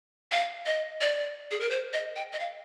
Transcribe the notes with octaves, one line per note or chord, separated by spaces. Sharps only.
F5
D#5
D5
G#4
A#4
C5
D#5
G5
D#5
F5